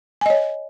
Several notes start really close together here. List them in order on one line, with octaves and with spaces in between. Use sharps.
G#5 D#5 C#5